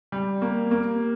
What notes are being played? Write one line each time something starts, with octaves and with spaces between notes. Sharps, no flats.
G3
A#3
A#3